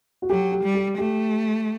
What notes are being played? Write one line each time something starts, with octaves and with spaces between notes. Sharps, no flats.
F#4
F#3 G4
G4
G3
G4
A3 G4